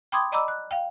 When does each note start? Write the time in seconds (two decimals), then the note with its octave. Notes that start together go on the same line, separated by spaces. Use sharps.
0.12 G5 B5 C6 D6 D#6 G#6
0.32 D5 D#5 A#5 B5 D6 E6
0.48 F#6
0.71 F5 G5